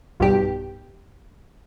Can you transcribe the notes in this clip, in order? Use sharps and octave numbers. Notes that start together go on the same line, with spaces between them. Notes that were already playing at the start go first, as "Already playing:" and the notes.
B1 G2 G4